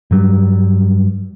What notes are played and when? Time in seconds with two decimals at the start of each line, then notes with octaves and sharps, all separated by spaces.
0.11 G2 F#3 G3